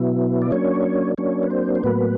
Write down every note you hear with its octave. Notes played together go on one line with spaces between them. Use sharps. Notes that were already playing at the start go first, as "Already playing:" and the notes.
Already playing: B2 F#3 B3 E4
D5
F#3 A#3 C#4 D4 C#5
F#3 A#3 C#4 D4 C#5
B4
C4 C5
C5
A2 F#3 A#3 B3 B4